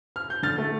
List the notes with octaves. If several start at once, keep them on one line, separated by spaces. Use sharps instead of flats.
F6
G6
D3 F6 A6
A3